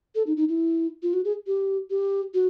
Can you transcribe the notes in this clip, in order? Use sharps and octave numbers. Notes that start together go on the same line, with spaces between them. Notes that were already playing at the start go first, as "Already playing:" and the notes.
A4
D#4
D#4
E4
F4
F#4
G#4
G4
G4
F#4